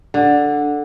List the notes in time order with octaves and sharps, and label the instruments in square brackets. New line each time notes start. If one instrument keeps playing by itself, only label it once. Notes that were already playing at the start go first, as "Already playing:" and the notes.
[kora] D3